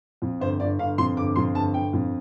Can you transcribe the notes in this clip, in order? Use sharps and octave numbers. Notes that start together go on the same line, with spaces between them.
F2
G1 C5
G1 D5
G1 F5
F2 C6
G1 D6
F2 C6
G1 A5
G1 G5
F2